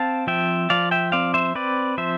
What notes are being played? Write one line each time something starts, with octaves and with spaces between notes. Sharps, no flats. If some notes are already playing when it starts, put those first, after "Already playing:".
Already playing: C4 F5 A5
F3 E5 G5
F3 D5 F5
E5 G5
C4 D5 F5
C5 E5
C4 B4 D5
F3 C5 E5